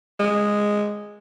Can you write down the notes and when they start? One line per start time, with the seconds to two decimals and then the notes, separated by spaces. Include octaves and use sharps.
0.20 G#3